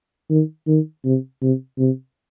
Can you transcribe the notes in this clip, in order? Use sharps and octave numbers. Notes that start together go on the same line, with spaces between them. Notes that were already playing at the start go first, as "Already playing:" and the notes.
D#3
D#3
C3
C3
C3